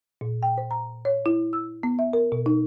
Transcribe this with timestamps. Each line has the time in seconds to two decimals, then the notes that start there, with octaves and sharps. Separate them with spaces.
0.21 A#2
0.43 G5
0.58 C5
0.71 A#5
1.05 C#5
1.26 E4
1.53 E6
1.83 B3
1.99 E5
2.13 A#4
2.32 B2
2.46 D#4